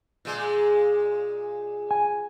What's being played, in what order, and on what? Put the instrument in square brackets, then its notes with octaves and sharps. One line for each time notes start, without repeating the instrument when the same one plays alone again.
[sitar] A#2 G#3
[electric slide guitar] G#5